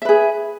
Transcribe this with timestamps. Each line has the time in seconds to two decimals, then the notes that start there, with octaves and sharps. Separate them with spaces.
0.02 E5
0.05 B4
0.09 G#4